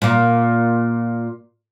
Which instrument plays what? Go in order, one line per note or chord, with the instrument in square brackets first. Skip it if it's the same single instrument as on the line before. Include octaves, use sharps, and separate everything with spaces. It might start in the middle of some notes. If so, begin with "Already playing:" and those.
[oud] A#2 A#3